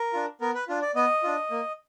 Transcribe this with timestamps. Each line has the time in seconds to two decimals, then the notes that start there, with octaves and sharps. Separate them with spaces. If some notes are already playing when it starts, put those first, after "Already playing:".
Already playing: A#4
0.13 D4 F4
0.41 B3 A#4
0.54 B4
0.68 D4 F4
0.82 D5
0.95 B3 D#5
1.23 D4 F4
1.51 A#3